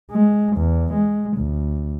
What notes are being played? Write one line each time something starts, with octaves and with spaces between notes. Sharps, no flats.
G#3
E2
G#3
D2